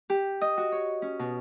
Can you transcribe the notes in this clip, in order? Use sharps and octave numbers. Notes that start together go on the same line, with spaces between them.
G4
D#5
F#4
C#5
C#4
B2